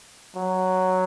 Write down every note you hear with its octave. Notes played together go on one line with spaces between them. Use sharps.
F#3